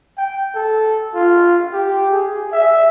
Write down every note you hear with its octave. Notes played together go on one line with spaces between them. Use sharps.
G5
A4
F4
G4
G#4
E5